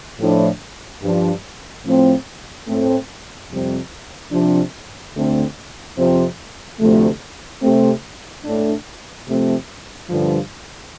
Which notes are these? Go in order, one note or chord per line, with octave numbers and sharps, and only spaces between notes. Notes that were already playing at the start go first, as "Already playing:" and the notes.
A2 F3 D4
G2 F3 D4
A2 F3 A3 C4
A2 A3 C4
F2 C3 G3 C4
C3 F3 D4
D2 D3 A3 C4
F2 C3 F3 C4
D2 C3 F3 A3
C3 A3 C4
A2 A3 D4
C3 F3 A3 C4
G2 D3 F3